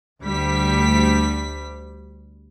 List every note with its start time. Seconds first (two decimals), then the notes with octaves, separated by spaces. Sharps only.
0.21 D2 G3 B6